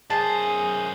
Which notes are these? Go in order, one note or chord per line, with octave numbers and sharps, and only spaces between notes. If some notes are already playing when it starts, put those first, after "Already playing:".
F#2 G#4 C5 A5